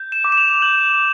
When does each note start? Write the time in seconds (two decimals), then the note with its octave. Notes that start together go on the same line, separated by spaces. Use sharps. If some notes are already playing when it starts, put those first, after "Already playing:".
Already playing: G6
0.12 E7
0.24 D6
0.32 E7
0.37 F7
0.62 G6 F#7